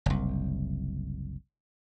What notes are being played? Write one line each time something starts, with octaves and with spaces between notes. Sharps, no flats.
F#1 C2